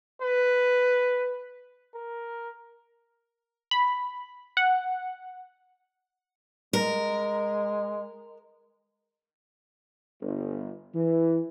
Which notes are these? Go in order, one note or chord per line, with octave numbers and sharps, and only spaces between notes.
B4
A#4
B5
F#5
G#3 A#4
G1
E3